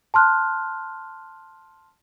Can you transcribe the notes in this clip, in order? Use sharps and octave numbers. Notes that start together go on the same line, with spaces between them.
A5 C6 F6 F#6